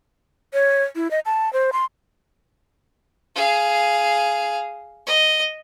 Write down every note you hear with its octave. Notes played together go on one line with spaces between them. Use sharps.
C#5
E4
D#5
A5
C5
C6
G#4 F5
D#5